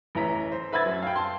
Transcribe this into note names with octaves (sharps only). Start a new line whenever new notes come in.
A1 E3 E4 A#5 B6
C5
B4 E5 B5 E6 G#6 A6
F#2
F5 G5
A5 C6